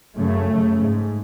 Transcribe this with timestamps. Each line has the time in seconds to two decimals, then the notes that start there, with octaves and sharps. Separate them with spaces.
0.17 F#2 C#3 A3
0.50 F#2 C#3
0.80 G#2